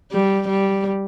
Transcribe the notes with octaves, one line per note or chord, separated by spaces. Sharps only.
G3
G3